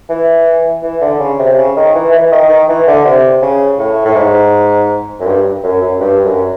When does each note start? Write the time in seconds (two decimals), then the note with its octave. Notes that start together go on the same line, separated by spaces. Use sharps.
0.10 E3
0.83 E3
1.01 D3
1.20 C#3
1.39 C3
1.58 C#3
1.76 D#3
1.95 E3
2.12 E3
2.32 D#3
2.49 D#3
2.68 E3
2.87 D3
3.04 C3
3.42 C#3
3.78 A2
4.05 A2
4.15 G#2
5.20 F#2
5.26 G2
5.63 F#2
5.82 F#2
6.00 G2
6.24 F#2